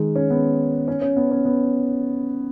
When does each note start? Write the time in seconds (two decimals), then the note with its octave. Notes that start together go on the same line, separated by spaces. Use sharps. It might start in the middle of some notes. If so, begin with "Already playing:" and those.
Already playing: D#3 G#3
0.16 C#4
0.30 B3
0.88 C#4
1.01 C#4
1.16 B3
1.31 C#4
1.45 B3